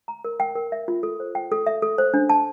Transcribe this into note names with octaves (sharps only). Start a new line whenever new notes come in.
A#5
A#4
G5
A#4
E5
F4
A4
C5
G5
A4
E5
A4
C5
D4
A5